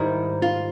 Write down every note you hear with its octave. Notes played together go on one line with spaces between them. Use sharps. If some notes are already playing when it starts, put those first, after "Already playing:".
Already playing: G#2 D#3 G3 E4
F4